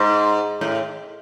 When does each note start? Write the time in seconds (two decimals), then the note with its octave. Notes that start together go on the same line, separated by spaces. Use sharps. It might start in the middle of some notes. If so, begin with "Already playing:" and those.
Already playing: G#2
0.61 A2